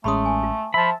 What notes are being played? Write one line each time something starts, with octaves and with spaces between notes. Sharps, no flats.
A1 G#3 A3 C#4 B5 C6 D#6
G#5
F4
F3 E5 A5 B5